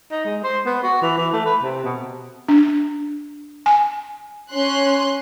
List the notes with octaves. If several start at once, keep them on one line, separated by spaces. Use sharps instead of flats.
D#4
G#3
C5
B3
F#4
E3
E3
A3
B4
C3
B2
D4
G#5
C#4 C6 F#6